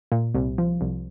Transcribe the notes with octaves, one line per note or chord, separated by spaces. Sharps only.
A#2
C2
F3
C2